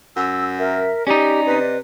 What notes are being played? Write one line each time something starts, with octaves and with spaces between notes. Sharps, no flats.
F#2 E6
A#4 E5
C#4 D#4 G4 D5 D#5
C3 B4